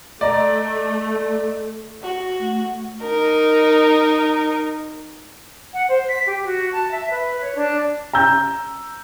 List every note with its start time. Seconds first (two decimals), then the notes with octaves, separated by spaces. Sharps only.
0.21 A3 D5 D#5 A#5
2.02 F#4
2.40 A3
3.03 D#4 A#4
5.74 F#5
5.89 C5
6.08 B6
6.27 G4
6.45 F#4
6.72 A5
6.92 E5
7.11 B4
7.41 C#5
7.56 D4
8.13 A#5 E6 G6